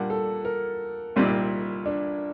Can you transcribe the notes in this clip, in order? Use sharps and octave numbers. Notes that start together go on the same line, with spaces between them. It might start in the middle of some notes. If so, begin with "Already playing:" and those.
Already playing: A#2 G3 A#3 D4 F#5
A4
A#4
C2 A#2 G3 C4 D#4
D4